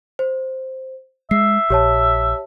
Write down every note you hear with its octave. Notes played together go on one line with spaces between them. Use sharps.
C5
G#3 E5 C7
A#1 G4 C#5 A5